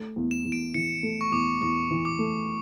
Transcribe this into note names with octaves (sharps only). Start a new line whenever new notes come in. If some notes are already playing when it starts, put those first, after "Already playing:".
Already playing: A3
E2
E7
E2
D7
E3 C#7
A3
C#6
E2 D6
E2 C#6
E3
D6
A3